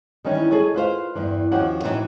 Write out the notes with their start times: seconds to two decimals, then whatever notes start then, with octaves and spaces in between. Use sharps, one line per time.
0.25 D#3 E3 G3 C#4 D#4
0.51 G#4 A4 C#5 D#5
0.74 F4 B4 C5 F5
1.15 E2 G2 E3
1.51 D#2 F3 C#4 F#4 G4 F#5
1.84 A2 C3 E3 F#3 D#4